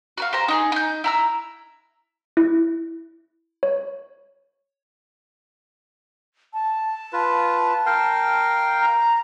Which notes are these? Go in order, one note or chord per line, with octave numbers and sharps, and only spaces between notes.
F#4 B4 F5
G4 C5 A#5
D#4 G4 G#4
D#4 G6
E4 A#5 E6
E4
C#5
A5
F4 B4
A#4 F5 G5
A#5